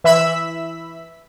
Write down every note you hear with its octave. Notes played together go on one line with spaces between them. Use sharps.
E3 E5 B5 E6 B6